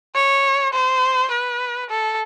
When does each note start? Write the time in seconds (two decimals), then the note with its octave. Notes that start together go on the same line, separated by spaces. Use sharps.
0.15 C#5
0.73 C5
1.31 B4
1.90 A4